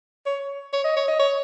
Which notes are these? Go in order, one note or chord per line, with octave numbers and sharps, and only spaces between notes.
C#5
C#5
D#5
C#5
D#5
C#5